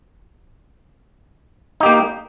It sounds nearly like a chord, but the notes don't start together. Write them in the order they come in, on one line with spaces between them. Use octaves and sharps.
D#4 G4 A#3